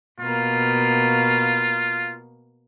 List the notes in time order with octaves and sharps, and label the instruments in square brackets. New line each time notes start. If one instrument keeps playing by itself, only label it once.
[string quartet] B2 A#3 [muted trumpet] F4